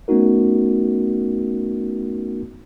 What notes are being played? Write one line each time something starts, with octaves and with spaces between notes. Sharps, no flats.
A3 B3 C#4 D#4 F#4 A#4